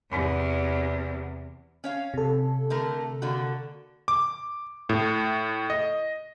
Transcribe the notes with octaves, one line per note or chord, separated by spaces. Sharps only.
E2 C3
C#4 C#5 F5
C3 A4
D3 A3 A#4
D3 A#3 F#4
D6
A2
D#5